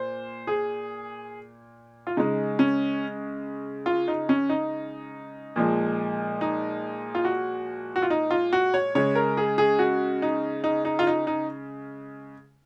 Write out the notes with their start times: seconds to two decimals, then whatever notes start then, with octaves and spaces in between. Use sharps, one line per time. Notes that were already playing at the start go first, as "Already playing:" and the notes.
Already playing: A#2 C5
0.47 G#4
2.07 F4
2.17 C#3 G#3 D#4
2.59 C#4
3.86 F4
4.08 D#4
4.29 C#4
4.49 D#4
5.56 A#2 F3 G#3
6.41 D#4
7.15 F4
7.25 F#4
7.96 F#4
8.02 F4
8.10 D#4
8.31 F4
8.53 F#4
8.74 C#5
8.95 C#3 G#3 C#5
9.15 A#4
9.37 G#4
9.58 G#4
9.79 F#4
10.22 D#4
10.64 D#4
10.85 D#4
10.99 F4
11.07 D#4
11.27 D#4